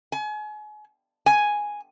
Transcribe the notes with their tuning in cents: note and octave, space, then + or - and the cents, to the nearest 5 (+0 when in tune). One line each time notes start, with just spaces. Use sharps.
G#5 +35
G#5 +0